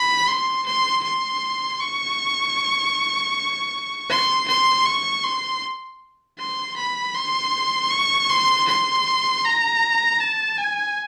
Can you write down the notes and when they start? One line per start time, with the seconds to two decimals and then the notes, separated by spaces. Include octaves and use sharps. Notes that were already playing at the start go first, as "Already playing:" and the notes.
Already playing: B5
0.27 C6
0.66 C6
1.03 C6
1.80 C#6
4.10 C6
4.48 C6
4.86 C#6
5.24 C6
6.39 C6
6.76 B5
7.15 C6
7.91 C#6
8.30 C6
8.68 C6
9.45 A#5
10.20 A5
10.58 G#5